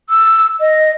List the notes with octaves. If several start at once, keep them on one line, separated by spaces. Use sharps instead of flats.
E6
D#5